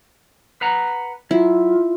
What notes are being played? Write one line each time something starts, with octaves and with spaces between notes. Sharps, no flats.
B4 F#5 A#5
F#3 E4 F4